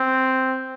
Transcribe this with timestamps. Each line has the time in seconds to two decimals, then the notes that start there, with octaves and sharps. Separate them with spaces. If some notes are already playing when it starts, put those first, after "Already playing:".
Already playing: C4